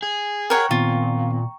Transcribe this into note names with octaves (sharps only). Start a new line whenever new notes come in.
G#4
A#4 C#5 F#5 G5 A#5 C#6
A#2 D#3 B3 C4 F4